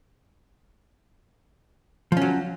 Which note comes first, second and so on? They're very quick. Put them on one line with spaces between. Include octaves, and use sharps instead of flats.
F3 C#4 F#3